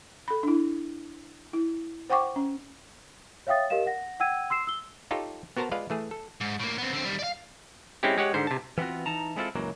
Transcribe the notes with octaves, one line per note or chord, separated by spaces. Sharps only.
A4 B5
D4 E4
E4
C5 F#5 G5 C#6 D6
C#4
C#5 E5 F5 G5 D#6 A6
G4 A#4 D#5 F5 E7
F#5 A#6
F#5 G5 E6 G#6 D#7
C6 E6 C7 E7
E6 G7
D#4 F4 G4 A4 C#5
B3 F#4 A#4 C5 A5 A#5
G#3 F4 B4 D5 F5
E3 A3 G#4
A4
G#2
A2 A#3
B3 C4
D3 C4
D#3 G3
D5 F5
G#3 C4 C#4 E4 G4
G#3 G4 C#5 F#5
G#2 D3 C5
C3 A5
E3 B3 C4 F4 F#4
E3 D#4 A5 A#5
G#3 B3 C4 E4 F4 A4
C#2 F#2 E3 F#3 A#3